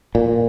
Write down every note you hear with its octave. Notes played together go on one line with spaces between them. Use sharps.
A#2